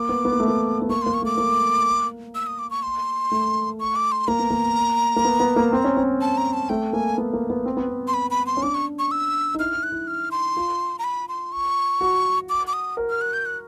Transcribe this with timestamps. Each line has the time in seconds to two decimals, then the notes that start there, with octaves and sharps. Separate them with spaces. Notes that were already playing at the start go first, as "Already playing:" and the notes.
Already playing: A#3 D6
0.09 B3
0.25 B3
0.32 A#3
0.40 A3
0.48 A#3
0.82 B3
0.89 A#3 C#6
1.02 A#3 C6
1.14 C#6
1.22 A3 D6
1.38 A#3
2.35 E6
2.47 D#6
2.59 D6
2.71 C#6
2.83 C6
3.32 A3
3.80 C#6
3.96 D6
4.12 C6
4.28 A#3 A#5
4.39 B3
4.51 A#3
5.16 A#3
5.25 B3
5.40 B3
5.56 A#3
5.73 C4
5.84 C#4
5.97 C4
6.21 A5
6.37 A#5
6.53 A5
6.69 A3 G5
6.93 A#3 G#5
7.18 B3
7.33 A#3
7.50 B3
7.65 C4
7.77 B3
7.88 C4
8.08 C6
8.14 B5
8.31 B5
8.47 C6
8.57 C#4
8.63 D4 D6
8.75 C#6
8.99 C#6
9.11 E6
9.55 D#4
9.59 E4 F6
9.75 E4
9.83 F#6
9.92 E4
10.07 F6
10.31 C6
10.56 F4
10.99 A#5
11.04 B5
11.29 C6
11.52 C#6
12.01 F#4
12.49 D6
12.67 D6
12.73 D#6
12.97 A#4
13.10 F6
13.21 F#6
13.33 G6
13.46 F#6